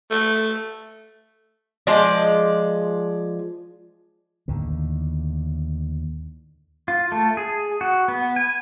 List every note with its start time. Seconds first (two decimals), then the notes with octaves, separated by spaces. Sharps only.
0.10 A3
1.87 F3 G#3 D5
4.48 D#2 A2 D3
6.88 F4
7.12 A3
7.37 G#4
7.81 F#4
8.08 B3
8.36 G#5